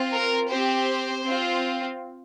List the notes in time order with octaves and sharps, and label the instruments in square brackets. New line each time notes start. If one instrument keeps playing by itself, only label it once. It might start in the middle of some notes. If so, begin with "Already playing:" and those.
Already playing: [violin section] C4 F4
A#4
C4 G4 C5
C4 F4